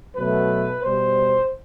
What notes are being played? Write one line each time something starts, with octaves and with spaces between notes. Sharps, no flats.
B2 F#3 A3 B4
B2 G3 C5